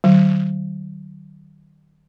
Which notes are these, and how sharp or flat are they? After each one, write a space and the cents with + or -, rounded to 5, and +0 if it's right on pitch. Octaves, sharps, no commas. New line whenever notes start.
D#3 -30 F#3 +35